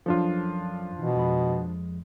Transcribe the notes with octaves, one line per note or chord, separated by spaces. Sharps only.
F#2 F3 D4 F4 A4
B2 E3
F2 G#3 B5